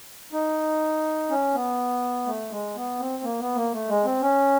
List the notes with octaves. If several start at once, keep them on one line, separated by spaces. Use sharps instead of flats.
D#4
C#4
B3
A3
G#3
B3
C4
A#3
B3
A#3
A3
G#3
C4
C#4